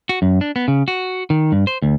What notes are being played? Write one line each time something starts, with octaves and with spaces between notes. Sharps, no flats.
F#4
F#2
D4
B3
C#3
F#4
D#3
G2
C5
D2